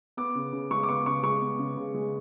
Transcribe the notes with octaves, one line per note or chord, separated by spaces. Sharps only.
B3 D6
C#3
C#3
G#3 C#6
D6
B3 C#6
C#3 C#6
G#3 C#6
B3
C#3
C#3
G#3